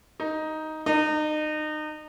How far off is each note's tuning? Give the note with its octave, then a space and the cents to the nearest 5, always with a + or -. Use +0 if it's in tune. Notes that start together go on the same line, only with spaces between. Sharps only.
D#4 +5
D#4 -30